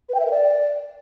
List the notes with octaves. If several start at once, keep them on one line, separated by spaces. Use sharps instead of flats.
B4
G5
E5
A#4
D5